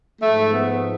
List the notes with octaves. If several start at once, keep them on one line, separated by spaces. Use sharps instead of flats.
G#2 F3 A3
B3